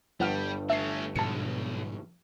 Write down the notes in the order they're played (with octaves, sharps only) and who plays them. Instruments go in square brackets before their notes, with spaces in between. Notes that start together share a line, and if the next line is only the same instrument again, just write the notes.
[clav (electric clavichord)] G1 G2 [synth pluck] F3 F#5 F6 [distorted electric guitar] G3
[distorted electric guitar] A3 C#4 [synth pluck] E5 C7
[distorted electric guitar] B1 [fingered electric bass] G#2 B2 F3 [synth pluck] A5 C#7